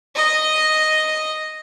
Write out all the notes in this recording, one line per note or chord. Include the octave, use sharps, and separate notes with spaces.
D#5